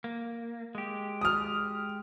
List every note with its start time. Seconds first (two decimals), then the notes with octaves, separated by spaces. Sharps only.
0.04 A#3
0.75 G#3 G4
1.21 D#6 F6